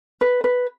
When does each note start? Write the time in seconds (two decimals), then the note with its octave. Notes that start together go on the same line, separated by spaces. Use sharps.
0.21 B4
0.44 B4